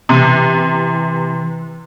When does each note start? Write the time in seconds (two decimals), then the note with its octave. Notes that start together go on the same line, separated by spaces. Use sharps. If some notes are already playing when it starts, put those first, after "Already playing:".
0.09 C3 E3